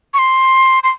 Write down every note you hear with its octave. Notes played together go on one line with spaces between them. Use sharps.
C#6
C6
C6